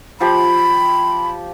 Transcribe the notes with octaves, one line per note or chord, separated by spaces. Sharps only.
F3 G4 B5